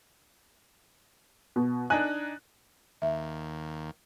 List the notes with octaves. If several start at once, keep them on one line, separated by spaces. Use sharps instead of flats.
B2
D4 D#4 G#5 F#6
D#2 E5